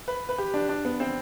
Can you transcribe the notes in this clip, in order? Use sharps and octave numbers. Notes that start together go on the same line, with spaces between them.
B4
B4
G4
D4
D4
B3
C4